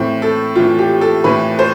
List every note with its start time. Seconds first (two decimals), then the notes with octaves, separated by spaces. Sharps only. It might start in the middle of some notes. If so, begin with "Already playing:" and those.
Already playing: A2 E3 C4
0.22 A4
0.55 A2 E3 F4
0.79 G4
1.01 A4
1.24 A2 E3 B4
1.59 C5